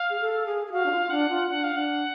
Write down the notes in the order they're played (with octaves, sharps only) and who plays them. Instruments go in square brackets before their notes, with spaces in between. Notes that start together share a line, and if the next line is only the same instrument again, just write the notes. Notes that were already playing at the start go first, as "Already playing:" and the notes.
Already playing: [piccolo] F5
[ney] G#4
A4
G#4
G#4
[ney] F#4 [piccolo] F5
[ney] D4
F4
[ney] D4 [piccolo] F#5
[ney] F4
[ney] D4 [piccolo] F#5
[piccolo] F5
[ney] D4 [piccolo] F#5